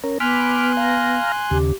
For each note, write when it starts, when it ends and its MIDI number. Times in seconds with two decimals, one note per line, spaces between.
0.04 0.18 61
0.04 0.18 70
0.20 1.18 59
0.20 1.58 80
0.20 0.72 83
0.20 1.58 84
0.20 0.72 86
0.20 0.72 89
0.20 1.58 90
0.77 1.32 77
0.77 1.32 82
1.51 1.73 39
1.51 1.73 49
1.51 1.73 67